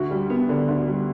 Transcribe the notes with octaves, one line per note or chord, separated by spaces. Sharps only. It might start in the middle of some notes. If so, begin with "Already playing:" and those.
Already playing: D2 F#4
G3
B3
D3
D2
G3